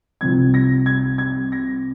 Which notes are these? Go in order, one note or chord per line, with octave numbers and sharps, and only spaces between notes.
C2 C3 F3 C4 G#6
A#6
G#6
G#6
A#6